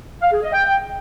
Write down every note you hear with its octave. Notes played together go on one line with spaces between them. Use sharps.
F5
G#4
D#5
G5